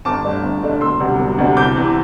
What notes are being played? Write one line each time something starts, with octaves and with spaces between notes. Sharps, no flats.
G1 A5 D6
G2 D3 A3 D4
G1
G2 D3 A3 D4
E1 C6 E6
D2 C3 G3
E1
D2 C3 G3
C2 D6 G6
C3 E3